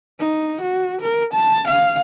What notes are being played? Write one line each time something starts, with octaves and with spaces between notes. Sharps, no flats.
D#4
F#4
A#4
A5
F5